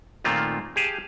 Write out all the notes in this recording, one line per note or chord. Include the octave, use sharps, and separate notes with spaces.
A#2 D#3 A3 A#3 C4 F4
G4 G#4 F5 A5